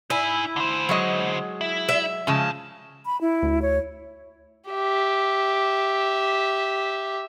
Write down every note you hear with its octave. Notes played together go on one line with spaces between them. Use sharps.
D#4 E4 G#5
D3 C5
F#3 G#3 D#5
E4
E5
G#2 C#3 F3 G#3 A5
B5
E4
D2
C#5
G4 E5